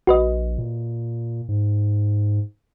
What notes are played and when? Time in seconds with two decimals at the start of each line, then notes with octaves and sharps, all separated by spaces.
0.07 A#1 F#4 B4 D#5
0.58 A#2
1.49 G#2